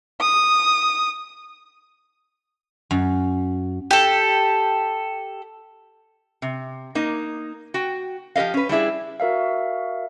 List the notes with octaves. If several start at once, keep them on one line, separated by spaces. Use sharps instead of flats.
D#6
F#2
G4 A4
C3
A#3 D#4
F#4 G5
F3 G4 A#4 D#5 F5
C#4 B4
G3 D4 E4 G#4
F#4 A#4 E5 F5